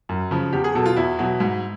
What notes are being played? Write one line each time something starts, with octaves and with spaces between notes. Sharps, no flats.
F#2
C#3 F3
E2 G4
G#4
B2 F#3 A4
F4
E2 E4
B2 F#3
G#2